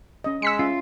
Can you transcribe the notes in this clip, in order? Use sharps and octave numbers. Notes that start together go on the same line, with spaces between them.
C#4 D#5
G#3 E6 B6 C#7
C#4 F4 E5